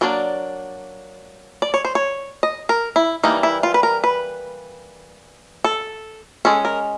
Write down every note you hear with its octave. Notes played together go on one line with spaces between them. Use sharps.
F#3 A#3 D4 D5
D5
C#5
C5
C#5
D#5
A#4
E4
E3 G3 A#3 D#4
E4
F4
B4
A#4
B4
A4
G#3 C#4 A4
A#4